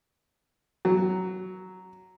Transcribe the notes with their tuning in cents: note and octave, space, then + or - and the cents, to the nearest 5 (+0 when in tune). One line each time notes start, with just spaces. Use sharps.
F#3 +10